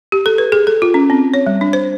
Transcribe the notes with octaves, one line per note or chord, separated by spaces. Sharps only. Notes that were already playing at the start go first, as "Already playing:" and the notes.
G4
A4
B4
G#4
A4
F4
C#4
C4
C#5
G3
D4
C5